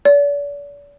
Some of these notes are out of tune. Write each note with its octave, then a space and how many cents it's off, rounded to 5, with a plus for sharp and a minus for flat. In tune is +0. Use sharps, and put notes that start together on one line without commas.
D5 -40